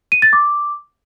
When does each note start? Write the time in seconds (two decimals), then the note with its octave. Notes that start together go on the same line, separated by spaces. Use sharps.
0.12 D#7
0.22 A6
0.33 D6